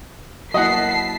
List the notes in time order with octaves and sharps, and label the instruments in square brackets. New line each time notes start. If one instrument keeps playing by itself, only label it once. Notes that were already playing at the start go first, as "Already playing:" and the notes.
[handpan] F#3 A#3 E4 [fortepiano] D#5 F#5 [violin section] A5 B6 C7